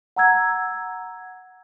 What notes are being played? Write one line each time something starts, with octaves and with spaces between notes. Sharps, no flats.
F#5 A#5 E6 G#6